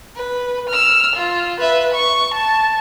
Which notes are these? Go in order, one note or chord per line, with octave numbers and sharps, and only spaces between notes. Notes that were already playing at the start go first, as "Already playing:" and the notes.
B4
E6 F6
F4
B4 E5
C#6
A5